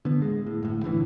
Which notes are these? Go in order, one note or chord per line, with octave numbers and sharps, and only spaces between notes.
D3 B3
D1 G#3
A2
G1 A2
D2 A2 D3 E3